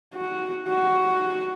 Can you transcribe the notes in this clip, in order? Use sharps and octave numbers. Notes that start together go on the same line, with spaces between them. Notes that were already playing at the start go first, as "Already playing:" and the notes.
F#4
F#4